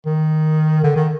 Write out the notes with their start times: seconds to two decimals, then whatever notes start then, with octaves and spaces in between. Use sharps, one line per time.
0.06 D#3
0.84 D3
0.96 D#3